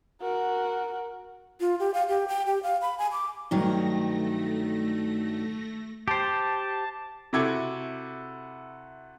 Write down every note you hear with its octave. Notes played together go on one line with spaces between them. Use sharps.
F#4 A#4
F4
G4
F5
G4
G5
G4
F5
B5
G#5
D6
G2 D#3 F#3 A3 A#6
G4 C5 A5
C3 E4 F#4 A4 D6 G#6